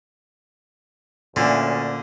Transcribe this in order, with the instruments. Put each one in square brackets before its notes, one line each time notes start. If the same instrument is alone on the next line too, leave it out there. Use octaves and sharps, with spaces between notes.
[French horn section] D2 C#4 [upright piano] A#2 [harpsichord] D3